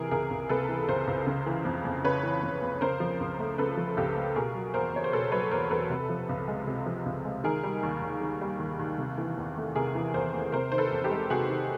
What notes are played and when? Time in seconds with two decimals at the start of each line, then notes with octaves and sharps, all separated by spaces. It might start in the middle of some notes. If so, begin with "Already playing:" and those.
Already playing: C3 E3 G#4 A#4
0.11 C#2 G#4 A#4
0.30 C#2
0.49 C3 A4 B4
0.69 E3
0.88 C#2 A#4 C5
1.07 C#2
1.27 C#3
1.46 E3
1.65 F2
1.85 F2
2.04 C#3 B4 C#5
2.23 E3
2.43 F2
2.62 F2
2.81 C#3 A#4 C5
3.00 F3
3.20 C#2
3.39 A3
3.58 C#3 A4 B4
3.77 F3
3.97 C#2 G4 A4
4.16 A3
4.36 B2 G#4 A#4
4.55 F#3
4.74 E2 A#4 C5
4.93 E2 C#5
5.04 C5
5.12 B2 A4 B4
5.32 F#3 B4 C#5
5.51 E2 A#4 C5
5.70 E2 A4 B4
5.90 C3
6.09 F3
6.29 C#2
6.48 G#3
6.67 C3
6.86 F3
7.06 C#2
7.25 G#3
7.44 D#3 G#4 A#4
7.63 G3
7.83 D#2
8.02 D#2
8.21 D#3
8.41 G3
8.60 D#2
8.80 D#2
8.98 C3
9.18 E3
9.38 E2
9.57 A3
9.76 C3 G#4 A#4
9.95 E3
10.14 E2 A#4 C5
10.34 A3
10.52 C3 A#4 C5
10.72 D#3 C5
10.78 A4 B4
10.91 E2
11.04 G4 A4
11.11 G#3
11.30 C3 F#4 G#4
11.49 D#3